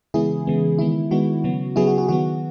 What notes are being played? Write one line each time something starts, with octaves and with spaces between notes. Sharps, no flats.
C#3 E3 G#3 B3 E4 G#4
C#3 E3 G#3 B3
D#3 G#3 B3 E4
D#3 G#3 B3 F#4
C#3 F#3 B3
C#3 F#3 B3 E4 G#4
F#4
F#4
D#3 F#3 B3 F#4